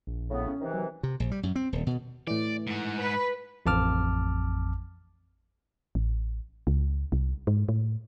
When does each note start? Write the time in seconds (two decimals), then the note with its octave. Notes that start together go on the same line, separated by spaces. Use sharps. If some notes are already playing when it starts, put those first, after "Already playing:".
0.07 A#1
0.30 A2 C#3 B3
0.48 C#4
0.61 C3 D#3 E3
0.73 F#3
1.03 C3
1.20 A#1
1.31 G3
1.43 F#2
1.56 C4
1.73 D#1
1.87 B2
2.27 A2 E3 D5
2.67 G#2 F#5
3.00 B4
3.66 A1 F2 A5 D6 F6
5.95 A1
6.67 C#2
7.12 C2
7.47 G#2
7.69 A2